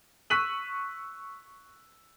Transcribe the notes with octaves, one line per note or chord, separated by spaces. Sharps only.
C#6 E6 F#6 B6 D#7 F#7